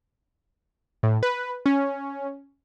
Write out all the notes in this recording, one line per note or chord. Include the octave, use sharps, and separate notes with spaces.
A2
B4
C#4